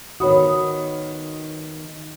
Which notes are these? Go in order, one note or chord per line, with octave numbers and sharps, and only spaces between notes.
D#3 B3 F#4 C#5 B5 D#6